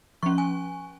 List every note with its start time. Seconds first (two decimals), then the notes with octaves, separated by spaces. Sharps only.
0.23 F3 C#4 C#6
0.38 G#5